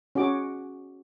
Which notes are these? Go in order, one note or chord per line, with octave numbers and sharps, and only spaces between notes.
C#4 F#4 G#4 D6